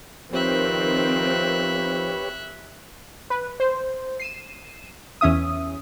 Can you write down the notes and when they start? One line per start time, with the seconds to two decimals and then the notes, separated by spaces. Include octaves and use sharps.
0.33 D#3 F3 C4 G4 B4 C#5 E5 F#6
3.30 B4
3.60 C5
4.20 C7 D#7 E7
5.21 E2 C#4 E5 D#6